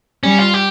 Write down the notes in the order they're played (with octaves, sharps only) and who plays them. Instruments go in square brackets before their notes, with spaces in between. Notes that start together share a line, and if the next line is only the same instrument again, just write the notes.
[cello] G3 [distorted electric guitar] C#4
[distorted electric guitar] F4
G4